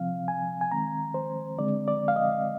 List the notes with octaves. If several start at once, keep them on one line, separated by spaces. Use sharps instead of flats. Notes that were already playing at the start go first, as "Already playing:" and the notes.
Already playing: C3 F3 C4 F5
G#5
G#5
D#3 G#3 C4 A#5
C5
D3 G#3 C4 D5
D5
F5
D#5